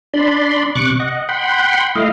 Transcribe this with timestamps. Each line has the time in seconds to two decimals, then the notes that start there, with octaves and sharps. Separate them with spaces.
0.14 D4 D5 B5 C6
0.75 C3 C#6 D6 F#6
1.00 D#5 F#5
1.29 F#5 G5 B5 C6
1.95 A3 E4 D#5 F5